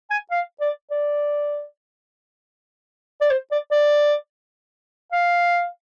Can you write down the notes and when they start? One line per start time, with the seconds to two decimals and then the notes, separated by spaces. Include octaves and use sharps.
0.10 G#5
0.31 F5
0.60 D5
0.91 D5
3.21 D5
3.31 C5
3.51 D5
3.71 D5
5.12 F5